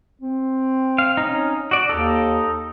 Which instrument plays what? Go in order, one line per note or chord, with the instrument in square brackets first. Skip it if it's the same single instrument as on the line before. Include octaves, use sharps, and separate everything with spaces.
[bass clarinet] C4
[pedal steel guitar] F5
C#4 D#4
F#4 D5
[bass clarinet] D#2 [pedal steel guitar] D#4 A4